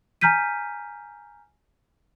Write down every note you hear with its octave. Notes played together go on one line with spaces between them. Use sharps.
G#5 A#5 F6 G6 B6 D#7